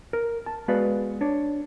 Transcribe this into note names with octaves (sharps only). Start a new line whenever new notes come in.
A#4
A5
G#3 B3 F#4 B4 D5 F5
D4 C#5